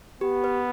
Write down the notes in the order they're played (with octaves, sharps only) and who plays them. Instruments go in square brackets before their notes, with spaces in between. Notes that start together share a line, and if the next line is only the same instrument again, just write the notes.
[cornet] B3 [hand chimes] G4
[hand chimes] B4